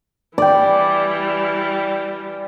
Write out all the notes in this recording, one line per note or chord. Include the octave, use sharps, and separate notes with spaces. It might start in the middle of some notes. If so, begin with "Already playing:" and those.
E3 G3 D5 G5